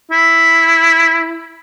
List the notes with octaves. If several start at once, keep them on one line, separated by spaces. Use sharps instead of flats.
E4